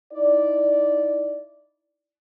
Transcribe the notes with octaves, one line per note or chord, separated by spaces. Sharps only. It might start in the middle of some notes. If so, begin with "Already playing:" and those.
D#4 E4 D5